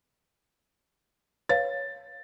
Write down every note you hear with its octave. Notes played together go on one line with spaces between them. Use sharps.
B4 C#5 F5 A6